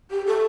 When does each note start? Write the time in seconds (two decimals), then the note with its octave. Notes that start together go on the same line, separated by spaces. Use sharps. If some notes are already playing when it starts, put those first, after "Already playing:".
0.11 G4
0.26 A4